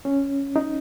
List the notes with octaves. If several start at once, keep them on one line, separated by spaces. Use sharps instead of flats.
C#4
D#4